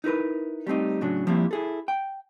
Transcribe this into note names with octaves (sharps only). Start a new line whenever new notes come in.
D#4 E4 A#4 B4
G3 A3 C4 D#4
A2 C#3 F#3 D4
F3 G3 A#3 C4 E4
E4 G#4 A4
G5